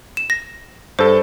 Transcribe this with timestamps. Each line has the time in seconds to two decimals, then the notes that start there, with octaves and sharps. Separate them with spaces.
0.17 E7
0.30 A#6
0.99 G2 A4 C5